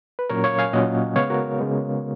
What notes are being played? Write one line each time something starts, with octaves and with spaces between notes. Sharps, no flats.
B4
A#2 F#3 C#4 A#4 C#5
C#5 F5
F5 G#5
A#2 F#3 C#4 D#5 F#5
C#3 G#3 B3 C#5 F5
F#4 A#4
C#3 G#3 B3